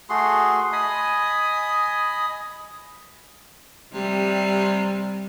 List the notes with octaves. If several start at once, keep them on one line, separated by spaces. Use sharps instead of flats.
A3 F#4 G#4 C6
D#5 G#5 B5 D#6
C3 G3